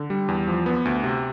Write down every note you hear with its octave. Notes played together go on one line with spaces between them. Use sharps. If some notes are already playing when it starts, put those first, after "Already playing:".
Already playing: D3
G3
E2
F3
B3
D2
C3